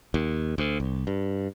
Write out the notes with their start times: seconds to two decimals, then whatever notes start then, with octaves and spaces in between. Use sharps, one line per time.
0.14 D#2
0.58 D2
0.80 C2
1.07 G2